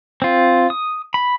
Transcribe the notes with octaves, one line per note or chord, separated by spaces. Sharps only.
C4 F4
D#6
B5